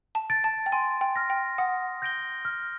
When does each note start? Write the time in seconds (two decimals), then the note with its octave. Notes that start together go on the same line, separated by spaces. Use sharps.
0.15 A5
0.30 A6 D7
0.44 A5
0.66 G5
0.72 G#5 C6
1.01 G5
1.16 F6 A#6
1.30 G5
1.58 F#5 D#6
2.02 G6 A#6 D7 G7
2.45 F6